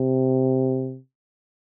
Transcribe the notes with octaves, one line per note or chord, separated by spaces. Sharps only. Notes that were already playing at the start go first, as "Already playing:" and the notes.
Already playing: C3